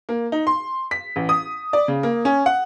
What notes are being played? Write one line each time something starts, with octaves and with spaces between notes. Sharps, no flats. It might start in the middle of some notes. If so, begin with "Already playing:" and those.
A#3
D#4
C6
B6
A1
D#6
D5
C#3
A#3
C#4
F#5